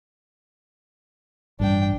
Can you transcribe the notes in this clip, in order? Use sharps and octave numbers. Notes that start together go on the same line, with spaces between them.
A1 G2 D4 G5